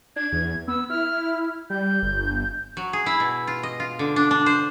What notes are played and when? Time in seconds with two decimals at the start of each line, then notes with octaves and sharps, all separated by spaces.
0.16 D4 G#6
0.32 E2
0.68 B3 E6
0.90 E4 F6
1.70 G3 G6
2.03 G1
2.77 F#3
2.93 G#4
3.06 E4
3.20 B2
3.47 F4
3.63 D#5
3.80 F4
3.99 D3
4.16 D4
4.31 D4
4.46 C5